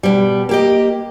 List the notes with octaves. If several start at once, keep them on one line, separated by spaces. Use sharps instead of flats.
B2 G3
A#3 G4 D#5